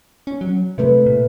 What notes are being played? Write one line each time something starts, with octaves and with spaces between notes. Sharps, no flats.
C#4
F#3
C3 A3 B4 E5
A#2